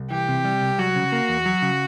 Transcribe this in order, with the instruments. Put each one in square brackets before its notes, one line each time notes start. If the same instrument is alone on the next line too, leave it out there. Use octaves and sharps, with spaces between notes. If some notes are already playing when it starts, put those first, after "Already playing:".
Already playing: [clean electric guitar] C2
[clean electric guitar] E3 [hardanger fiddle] G4
[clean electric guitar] C3
G3
C2
[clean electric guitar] F#3 [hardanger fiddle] F#4
[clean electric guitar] C#3
A#3
E2
F#3
C#3